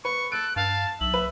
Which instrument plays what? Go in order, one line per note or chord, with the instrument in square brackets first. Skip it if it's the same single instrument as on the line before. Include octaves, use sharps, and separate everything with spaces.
[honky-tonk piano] B4 [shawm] C#6
[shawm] A4 [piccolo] F#6 [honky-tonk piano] D7
[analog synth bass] G2 [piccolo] F5 [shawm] A5
[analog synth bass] B1 [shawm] E5 [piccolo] F#7
[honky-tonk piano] B4